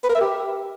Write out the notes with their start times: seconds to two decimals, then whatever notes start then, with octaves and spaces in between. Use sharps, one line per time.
0.04 B4
0.09 A#4
0.15 E5
0.21 G4